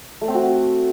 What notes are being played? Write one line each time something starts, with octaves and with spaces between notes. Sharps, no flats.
A3
C4
F#4